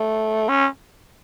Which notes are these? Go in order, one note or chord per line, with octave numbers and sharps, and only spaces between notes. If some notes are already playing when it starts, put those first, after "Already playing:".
Already playing: A3
C#4